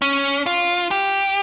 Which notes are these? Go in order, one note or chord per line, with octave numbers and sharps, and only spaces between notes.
C#4
F4
G4